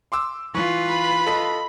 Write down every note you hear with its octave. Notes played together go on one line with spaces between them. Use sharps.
C6 D6 E6
E3 F4 B4 C#6
B5
A4 D#5 B6